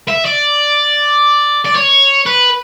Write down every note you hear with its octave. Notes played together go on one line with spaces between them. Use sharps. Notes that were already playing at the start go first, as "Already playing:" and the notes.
E5
D5
D5
C#5
B4